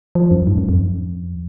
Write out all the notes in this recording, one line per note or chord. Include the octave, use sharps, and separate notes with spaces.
F3
F#2
G#2
F#2
F2